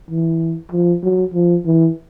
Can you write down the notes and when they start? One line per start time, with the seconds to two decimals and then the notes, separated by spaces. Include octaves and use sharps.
0.11 E3
0.72 F3
1.03 F#3
1.34 F3
1.66 E3